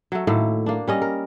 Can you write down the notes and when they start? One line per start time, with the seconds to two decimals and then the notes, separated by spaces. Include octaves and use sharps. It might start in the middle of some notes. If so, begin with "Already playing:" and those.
0.12 F#3 A3
0.27 A2 D#3 A3 A#3
0.66 A#3 D4
0.88 G3 C#4 D#5
1.02 A#4